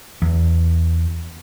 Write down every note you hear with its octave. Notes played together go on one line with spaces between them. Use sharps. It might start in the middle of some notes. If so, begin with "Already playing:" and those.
E2